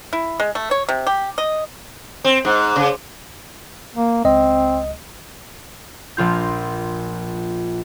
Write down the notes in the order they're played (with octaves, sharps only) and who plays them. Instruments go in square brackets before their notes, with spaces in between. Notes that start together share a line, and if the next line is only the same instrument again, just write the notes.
[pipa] E4
G#3
A3
C#5
C3
G4
D#5
[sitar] C4
G#2
C#3
[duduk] A#3
[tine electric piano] C#2 D#5 [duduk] C4
[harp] A#1 F4 G6